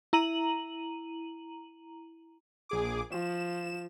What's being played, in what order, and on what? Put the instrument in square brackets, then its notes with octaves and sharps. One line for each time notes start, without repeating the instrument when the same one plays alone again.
[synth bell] E4 A#5 D#7 F#7
[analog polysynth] A#1 G#4 D6
[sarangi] F3 [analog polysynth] E7